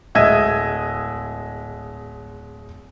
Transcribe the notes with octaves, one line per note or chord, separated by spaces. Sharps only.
D1 G#3 D#5 E5 G#6 D#7